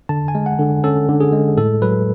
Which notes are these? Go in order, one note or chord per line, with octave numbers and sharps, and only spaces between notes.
D3 A5
G#5
G#3
F#5
D3
C#4 A4
D3
G#4
G#3
A2 A4
F#3 B4